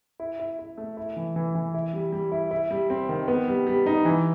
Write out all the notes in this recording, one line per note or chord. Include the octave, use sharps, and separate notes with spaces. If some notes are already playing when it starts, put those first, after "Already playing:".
E4
E4
E4
A3
E4
E3
E3
E3
E4
G3
G3
E4
E4
G3
C4
D#3
B3
G3
G3
D#4
E3